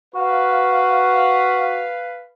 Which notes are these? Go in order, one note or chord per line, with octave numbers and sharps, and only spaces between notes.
F#4 B4 F5